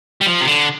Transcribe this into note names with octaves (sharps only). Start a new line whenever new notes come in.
G3
F3
C3
D3